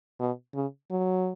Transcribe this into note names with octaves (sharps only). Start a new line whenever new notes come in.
B2
C#3
F#3